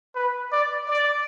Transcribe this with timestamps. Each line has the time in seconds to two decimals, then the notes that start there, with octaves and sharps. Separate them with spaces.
0.16 B4
0.52 D5
0.88 D5